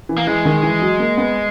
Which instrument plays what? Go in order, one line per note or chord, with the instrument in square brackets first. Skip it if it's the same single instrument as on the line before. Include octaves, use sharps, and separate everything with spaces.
[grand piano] E3
[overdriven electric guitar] A#3
[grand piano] E3 [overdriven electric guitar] G#3
[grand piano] D#3
E3
F#3
A#3
B3